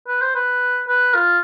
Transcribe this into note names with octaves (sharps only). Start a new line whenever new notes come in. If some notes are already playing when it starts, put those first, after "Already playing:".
B4
C5
B4
B4
F4